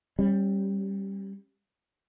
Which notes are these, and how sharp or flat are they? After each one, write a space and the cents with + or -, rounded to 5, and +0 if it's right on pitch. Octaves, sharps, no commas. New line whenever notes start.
G3 +0 C#4 -30